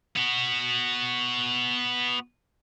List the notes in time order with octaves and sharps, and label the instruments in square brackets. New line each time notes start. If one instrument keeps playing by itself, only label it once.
[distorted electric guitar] B3 F#4